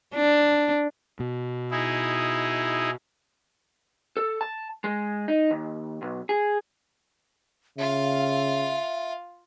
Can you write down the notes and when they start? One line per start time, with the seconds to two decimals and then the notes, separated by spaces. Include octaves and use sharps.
0.14 D4
1.20 B2
1.71 D#4 E4 G#4
4.17 A4
4.41 A5
4.84 G#3
5.28 D#4
5.51 D#2
6.02 B1
6.29 G#4
7.78 C#3 F4 E5 F5